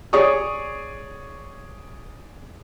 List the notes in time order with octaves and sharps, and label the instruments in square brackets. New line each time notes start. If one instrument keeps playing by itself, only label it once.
[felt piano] G#4 C#5 D5 C#6 D#6